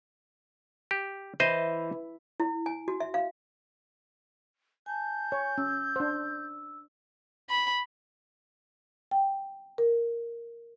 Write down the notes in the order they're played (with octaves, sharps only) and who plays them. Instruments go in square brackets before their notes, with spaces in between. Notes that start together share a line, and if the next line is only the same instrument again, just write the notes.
[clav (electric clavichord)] G4
[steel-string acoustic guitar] E3 [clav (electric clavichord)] C5 D#5
[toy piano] E4
G#5
F#4
E5
F5
[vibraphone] G#5 A5 [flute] G6
[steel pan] C#5 [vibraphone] G#5
[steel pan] C#4 [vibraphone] E6
[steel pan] D4 C5
[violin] B5
[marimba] G5
A#4